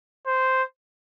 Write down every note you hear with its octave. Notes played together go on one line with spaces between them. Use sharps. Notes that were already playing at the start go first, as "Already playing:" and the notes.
C5